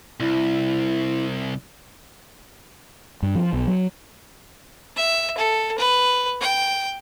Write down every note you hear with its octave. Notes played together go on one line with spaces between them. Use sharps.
C2 E4
G2
F3
B1
F#3
E5
A4
B4
G5